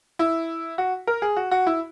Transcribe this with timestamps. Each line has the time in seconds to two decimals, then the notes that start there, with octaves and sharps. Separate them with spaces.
0.19 E4
0.78 F#4
1.07 A#4
1.22 G#4
1.37 F#4
1.51 F#4
1.67 E4